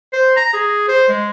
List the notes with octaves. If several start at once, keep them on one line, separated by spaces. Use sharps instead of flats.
C5
A#5
G#4
C5
G#3